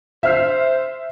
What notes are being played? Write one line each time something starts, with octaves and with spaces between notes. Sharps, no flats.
C5 E5 F6 C7